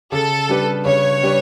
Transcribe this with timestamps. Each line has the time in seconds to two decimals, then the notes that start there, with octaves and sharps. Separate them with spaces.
0.12 C#3 A4
0.48 G3 D4 G4 B4
0.86 C#3 C#5
1.23 G3 D4 G4 B4